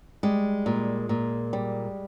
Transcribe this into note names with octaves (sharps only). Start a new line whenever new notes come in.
G3 G#3
A#2
A#2
G3